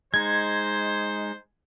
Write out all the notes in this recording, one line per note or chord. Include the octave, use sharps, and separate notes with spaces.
G#3 D#4 C5 G#6